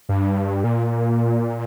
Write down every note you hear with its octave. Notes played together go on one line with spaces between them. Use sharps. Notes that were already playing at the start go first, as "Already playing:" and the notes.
G2
A#2